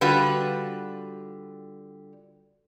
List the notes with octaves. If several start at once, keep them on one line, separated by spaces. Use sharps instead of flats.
D3 G3 F4 F#4 B4